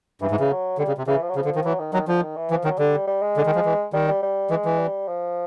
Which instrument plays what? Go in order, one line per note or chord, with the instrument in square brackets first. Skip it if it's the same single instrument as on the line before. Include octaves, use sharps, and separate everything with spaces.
[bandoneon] G2 [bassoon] E3
[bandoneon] G#2
C#3
[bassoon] F#3
[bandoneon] D3 [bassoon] G3
[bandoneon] C#3
C3
[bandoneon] C#3 [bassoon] E3
[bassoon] F3
F#3
[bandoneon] C#3 [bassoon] F3
[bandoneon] D3
D#3
[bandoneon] E3 [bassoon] F#3
[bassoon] D#3
[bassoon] D#3 [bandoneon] F#3
[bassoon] D3 [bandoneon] F3
[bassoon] D#3
E3
[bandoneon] E3 [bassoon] F3
[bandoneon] D#3 [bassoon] F#3
[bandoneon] D3 [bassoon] G3
[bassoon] G3
G#3
[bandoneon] D3
D#3
F3
E3
[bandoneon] D#3 [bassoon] G3
[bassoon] G3
G3
[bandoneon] E3 [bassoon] G#3
[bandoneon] E3
[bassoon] G3
F3